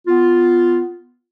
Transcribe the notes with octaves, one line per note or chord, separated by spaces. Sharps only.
B3 F4